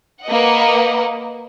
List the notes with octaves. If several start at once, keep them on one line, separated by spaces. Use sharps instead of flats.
A#3 B4 D#5 F#5